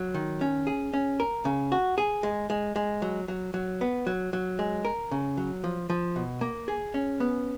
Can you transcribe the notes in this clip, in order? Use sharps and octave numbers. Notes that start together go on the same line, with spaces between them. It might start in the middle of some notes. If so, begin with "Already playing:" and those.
Already playing: F#3
D#3
C#4
G#4
C#4
A#4
C#3
F#4
G#4
G#3
G#3
G#3
F#3
F#3
F#3
B3
F#3
F#3
G#3
A#4
C#3
F#3
F3
F3
B2
A#3
G#4
C#4
B3